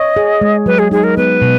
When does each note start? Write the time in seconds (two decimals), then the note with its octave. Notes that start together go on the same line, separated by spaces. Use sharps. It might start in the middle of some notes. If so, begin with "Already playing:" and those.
Already playing: C#5 D#5
0.16 G#4
0.41 G#3
0.66 F#3 B4
0.79 G#4
0.91 D#4 G#4
1.04 A#4
1.17 B3 B4
1.42 B2